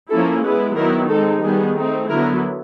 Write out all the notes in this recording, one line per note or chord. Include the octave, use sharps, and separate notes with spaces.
F3 A#3 C#4 E4 A4
G#3 B3 E4 B4
D#3 F#3 B3 E4 A#4
G#3 C4 D#4 A4
D#3 G3 B3 G#4
A3 C4 D#4
D3 F#3 B3 E4 A#4